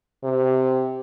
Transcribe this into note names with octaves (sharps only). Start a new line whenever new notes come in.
C3